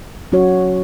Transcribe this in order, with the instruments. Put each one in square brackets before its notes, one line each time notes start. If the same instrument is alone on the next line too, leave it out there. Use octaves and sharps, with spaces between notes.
[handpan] F#3 C#4 F#4 C#5